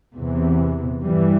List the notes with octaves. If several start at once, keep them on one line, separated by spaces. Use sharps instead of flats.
E2 C3 E3
G2 E3 G3